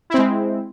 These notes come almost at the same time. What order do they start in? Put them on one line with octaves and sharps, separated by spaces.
E4 C4 G#3